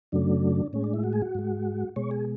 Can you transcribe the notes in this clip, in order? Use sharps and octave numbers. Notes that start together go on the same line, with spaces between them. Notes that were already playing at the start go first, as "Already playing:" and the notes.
F#2 C#3 F#3 A3 D4
A2 G#3 C#4
D4
E4
F#4
G#4
F#4
G#2 G#3
B2 G#3 C#5
G#4